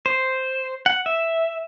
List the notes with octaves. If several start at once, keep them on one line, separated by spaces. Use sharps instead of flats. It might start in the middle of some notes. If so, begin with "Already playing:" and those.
C5
F#5
E5